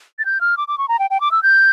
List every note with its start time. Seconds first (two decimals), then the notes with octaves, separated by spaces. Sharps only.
0.19 A6
0.25 G6
0.41 F6
0.57 D6
0.68 D6
0.78 C#6
0.88 A#5
0.99 G5
1.10 G5
1.21 D6
1.31 E6
1.43 G6